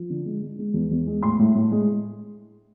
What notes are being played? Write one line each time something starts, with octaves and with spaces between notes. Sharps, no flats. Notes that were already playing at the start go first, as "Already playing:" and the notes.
Already playing: F3
D3
G#3
G#3
G#3
E2
E2
G#3
A2 C6
A2
A2
G#3